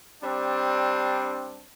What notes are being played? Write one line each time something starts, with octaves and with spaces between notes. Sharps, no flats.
G3 C4 D4